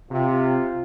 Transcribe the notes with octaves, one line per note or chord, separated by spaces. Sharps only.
C3 F4